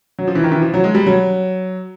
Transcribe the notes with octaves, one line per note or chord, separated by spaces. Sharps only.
F#3
F3
E3
D#3
E3
F3
F#3
G#3
G3
F#3